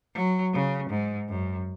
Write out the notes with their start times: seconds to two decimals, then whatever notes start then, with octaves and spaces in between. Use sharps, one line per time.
0.15 F#3
0.53 C#3
0.90 G#2
1.29 F#2